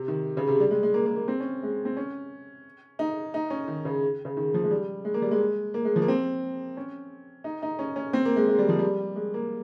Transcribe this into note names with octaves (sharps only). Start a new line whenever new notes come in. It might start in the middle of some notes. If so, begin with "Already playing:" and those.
Already playing: C3
D#3
C#3
C3
G3
G#3
G#3
A#3
A#3
A#3
C4
C#4
G#3
C4
C#4
D#4
D#4
C#4
D#3
C#3
C#3
D#3
F3
G#3
G3
G#3
A#3
G3
G#3
A#3
G#3
F3
A#3
C4
C#4
D#4
D#4
C#4
C#4
C4
A#3
G#3
G#3
G3
F3
G3
G#3
A#3